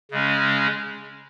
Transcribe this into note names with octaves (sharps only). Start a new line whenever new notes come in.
C#3 G#3 C#4